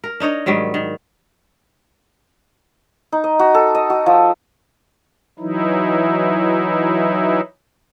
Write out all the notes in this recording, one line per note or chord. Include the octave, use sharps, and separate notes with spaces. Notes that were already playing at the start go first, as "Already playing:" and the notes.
A#4
D4 D#4 C#5 D#5
G#2 D#3 F#3 G3
D#3
D#4
D#5
F#4
A4
D#5
F#4
F3
E3 F#3 D#4 E4